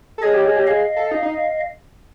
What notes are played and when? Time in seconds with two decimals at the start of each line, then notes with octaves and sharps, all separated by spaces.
0.18 A4
0.22 G#4 C#5 D#5
0.34 G4
0.45 G#4
0.56 G4
0.67 G#4 D#5 F5
0.96 A4
1.11 D#4
1.22 D#4